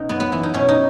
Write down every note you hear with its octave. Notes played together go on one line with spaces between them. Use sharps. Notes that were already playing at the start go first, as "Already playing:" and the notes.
Already playing: B2 C#4 D#4
F#2 B3
B3
E3 B3
D#4
B2 C#4
D#4